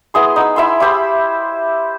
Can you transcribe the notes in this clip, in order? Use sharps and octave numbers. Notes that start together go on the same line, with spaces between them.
B3 E4 G#4 C6
D#4 F#5 E6
E4 E5 B5 C6
E4 G4 C5 B5